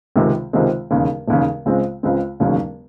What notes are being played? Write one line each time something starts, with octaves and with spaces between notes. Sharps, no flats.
C#2 C3 D#3 G#3 C4
C#2 C3 D#3 G#3 C4
E1 D#2 C#3
E1 D#2 C#3
C#2 C#3 G#3 C4
C#2 C#3 G#3 C4
E1 D#2 C#3 F#3 C#4